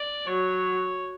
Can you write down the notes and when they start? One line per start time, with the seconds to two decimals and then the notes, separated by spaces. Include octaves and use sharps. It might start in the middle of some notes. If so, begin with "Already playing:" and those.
Already playing: D5
0.26 F#3 C#5